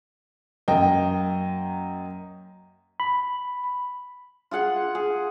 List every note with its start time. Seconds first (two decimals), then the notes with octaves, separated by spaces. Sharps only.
0.68 F#2 A#3 D#5 G5
3.00 B5
4.51 F4 G#4 F#5 G#5
4.95 G#4